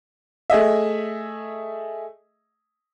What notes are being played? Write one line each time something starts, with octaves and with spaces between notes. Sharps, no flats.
A3 G#4 D#5 E5